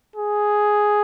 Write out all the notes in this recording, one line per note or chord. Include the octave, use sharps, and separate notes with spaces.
G#4